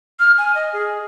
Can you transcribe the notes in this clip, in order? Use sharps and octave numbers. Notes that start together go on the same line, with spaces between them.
F6
G#5
D#5
G#4